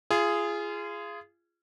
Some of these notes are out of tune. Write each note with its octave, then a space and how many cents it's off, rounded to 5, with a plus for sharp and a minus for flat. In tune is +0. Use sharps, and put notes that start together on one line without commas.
F4 -30 G#4 +0